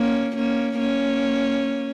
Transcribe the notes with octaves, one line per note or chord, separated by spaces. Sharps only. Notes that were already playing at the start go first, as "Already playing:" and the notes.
Already playing: A#3 C#4
A#3 C#4
A#3 C#4